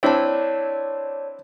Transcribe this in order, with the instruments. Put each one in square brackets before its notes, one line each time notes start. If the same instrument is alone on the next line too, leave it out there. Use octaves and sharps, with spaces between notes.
[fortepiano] C4 D4 E4 [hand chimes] C#5 D5 A5